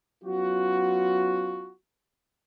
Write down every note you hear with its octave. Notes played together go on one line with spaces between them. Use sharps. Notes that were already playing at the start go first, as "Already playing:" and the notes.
F#3 B3 C#4 F4 F#4